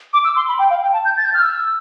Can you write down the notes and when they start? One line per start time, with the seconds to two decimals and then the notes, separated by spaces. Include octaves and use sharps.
0.13 D6
0.24 E6
0.36 C6
0.48 B5
0.59 G5
0.70 F5
0.82 G5
0.93 A5
1.05 G6
1.17 A6
1.25 G6
1.34 F6
1.42 E6